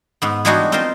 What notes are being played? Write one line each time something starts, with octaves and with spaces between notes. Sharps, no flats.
G#2 B3
E3 G3 G#3 D4 D#4 F#4
C4 D#4 F4 A#4 C5